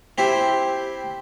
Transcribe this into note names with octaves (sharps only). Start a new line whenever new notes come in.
C4 E4 G4 C5